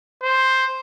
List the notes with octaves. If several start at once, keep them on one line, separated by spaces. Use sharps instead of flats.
C5